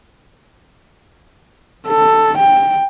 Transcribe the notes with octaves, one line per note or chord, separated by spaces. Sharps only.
A4
G5